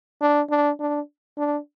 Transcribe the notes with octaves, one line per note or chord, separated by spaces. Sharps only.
D4
D4
D4
D4